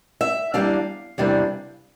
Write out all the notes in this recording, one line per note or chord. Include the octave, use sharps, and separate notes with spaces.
E5
E2 C3 G3 A#3 D4 F5
E2 C3 G3 A#3 D4